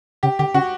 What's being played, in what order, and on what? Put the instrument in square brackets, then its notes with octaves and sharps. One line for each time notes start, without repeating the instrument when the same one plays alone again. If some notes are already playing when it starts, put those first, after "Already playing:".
[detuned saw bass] C#3 [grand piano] G4
[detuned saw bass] D3 [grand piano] G4
[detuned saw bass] C#3 [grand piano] F#4